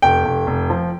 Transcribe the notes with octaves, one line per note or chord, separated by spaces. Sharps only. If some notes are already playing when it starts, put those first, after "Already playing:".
F1 G5
F1
F1
F3